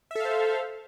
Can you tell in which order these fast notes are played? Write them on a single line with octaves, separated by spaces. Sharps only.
E5 A4 F5 C5